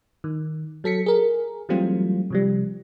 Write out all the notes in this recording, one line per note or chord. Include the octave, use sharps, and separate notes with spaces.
D#3
F#3 A4 B6 C#7
G#4 A#4
E3 F#3 G3 A3 C4 F4
C3 F3 G3